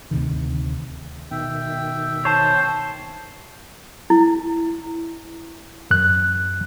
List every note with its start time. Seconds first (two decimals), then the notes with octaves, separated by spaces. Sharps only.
0.11 D2 C3 D#3
1.31 B2 D#3 E5 G5
2.25 C5 C#5 A5
4.10 E4
5.91 F#2 F#6